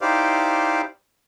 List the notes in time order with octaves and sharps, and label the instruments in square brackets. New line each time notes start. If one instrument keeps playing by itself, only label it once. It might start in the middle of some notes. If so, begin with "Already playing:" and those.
[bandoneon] D#4 E4 G4 C5 D5 F5